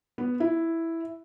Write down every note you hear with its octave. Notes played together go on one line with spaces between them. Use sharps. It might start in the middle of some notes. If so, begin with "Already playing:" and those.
B3
E4